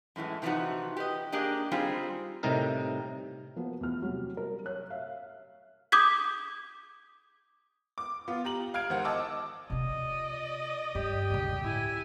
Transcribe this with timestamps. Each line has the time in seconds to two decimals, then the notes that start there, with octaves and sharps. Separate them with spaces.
0.16 F#2 A2 E3 G#3
0.42 C3 E3 F3 A3 D#4 F#4
0.97 G4 B4 D#5
1.32 A#3 D4 G4 G#4 D#5
1.71 G3 C4 D#4 F4 G#4
2.43 A2 C3 G3 D#4 A#4
3.56 F3 A#3 B3 F#4
3.81 E2 F6
4.00 C3 F#3 G3
4.37 A#4
4.66 C#5 F#6
4.90 E5 F5
5.92 D6 D#6 G6 G#6 B6
7.98 D6
8.28 B3 F4
8.45 G4 A#5 F#7
8.74 F5 F6 G#6 D7
8.90 G#1 C5 F#5
9.04 D#5 A5 D6 E6
9.70 C3 F4 D5 D#5
10.95 G2 G4
11.30 D2 C#3
11.62 A2 E4 G#5